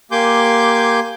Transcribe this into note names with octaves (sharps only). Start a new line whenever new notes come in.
A#3 G4 G#5 C6 D6 G6